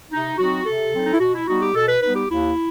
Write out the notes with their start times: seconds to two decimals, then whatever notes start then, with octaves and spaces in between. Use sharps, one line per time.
0.11 C3 D#4
0.38 F#3 C4 D#4 F#4
0.66 C3 A4
0.93 F#3 C4 D#4
1.03 D#4
1.11 E4
1.19 B2 F#4
1.34 E4
1.47 G3 B3 D#4 F#4
1.61 G4
1.74 B2 A4
1.87 B4
2.02 G3 B3 D#4 B4
2.16 G4
2.29 D#2 E4